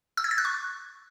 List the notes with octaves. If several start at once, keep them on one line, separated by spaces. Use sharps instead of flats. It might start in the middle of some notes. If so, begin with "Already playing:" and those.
E6
G#6
A6
F#6
C#6